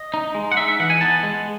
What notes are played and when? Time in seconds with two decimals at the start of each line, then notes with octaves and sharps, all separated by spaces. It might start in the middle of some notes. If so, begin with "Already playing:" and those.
Already playing: D#5
0.14 D#4
0.35 G#3
0.52 F#5
0.57 D#4 E5
0.68 E5
0.80 E3 F#5
0.90 G#5
1.01 B3 A5
1.23 G#3